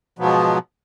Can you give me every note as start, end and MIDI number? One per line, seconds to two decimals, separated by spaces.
0.19 0.58 44
0.19 0.58 47
0.19 0.58 53
0.19 0.58 54
0.19 0.58 59